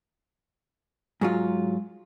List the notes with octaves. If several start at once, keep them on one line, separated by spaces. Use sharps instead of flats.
G#2 F#3 F4